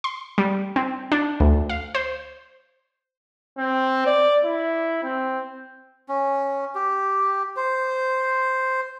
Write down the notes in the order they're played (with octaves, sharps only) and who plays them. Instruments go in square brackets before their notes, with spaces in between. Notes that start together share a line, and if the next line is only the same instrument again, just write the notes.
[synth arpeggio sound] C6
G3
C4
D4
D2
F5
C5
[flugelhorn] C4
D5
E4
C4
[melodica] C#4
G4
C5